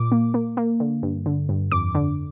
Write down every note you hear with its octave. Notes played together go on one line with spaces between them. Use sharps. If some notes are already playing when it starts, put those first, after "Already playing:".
Already playing: A#2 D6
A#3
A#3
A#3
D3
G2
D3
G2
F2 D6
D3